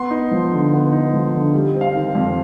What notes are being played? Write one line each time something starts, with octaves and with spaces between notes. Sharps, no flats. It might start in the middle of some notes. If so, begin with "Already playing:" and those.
Already playing: B3 C6
D#4
F3
D3
B3
D#4
F3
D3
G3
C4
F5
D#3
F2